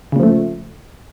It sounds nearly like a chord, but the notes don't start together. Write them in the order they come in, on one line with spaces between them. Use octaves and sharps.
C#3 A#2 F3 A3